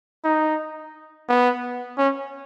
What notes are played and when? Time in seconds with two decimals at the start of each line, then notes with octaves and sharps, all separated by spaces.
0.24 D#4
1.29 B3
1.98 C#4